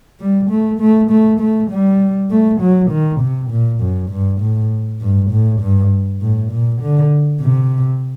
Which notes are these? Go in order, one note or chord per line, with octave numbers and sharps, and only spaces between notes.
G3
A3
A3
A3
A3
G3
A3
F#3
D#3
C3
A#2
F#2
G2
A2
G2
A2
G2
A2
A#2
D3
C3